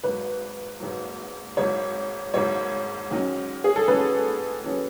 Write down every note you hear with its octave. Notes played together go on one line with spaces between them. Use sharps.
G#1 G#2 F#3 B4
G#1 G#2 F#3
G#1 G#2 F#3 C#5
G#1 G#2 F#3 C#5
G#2 D#3 F#3 C#4
G#4
A4
G#2 D#3 F#3 C#4 B4
D#3 F#3 C#4